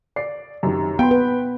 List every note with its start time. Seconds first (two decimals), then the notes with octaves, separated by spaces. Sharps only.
0.16 D5 C7
0.63 F#2 C3 D#3
0.99 B3 G5 B5 C6
1.11 B4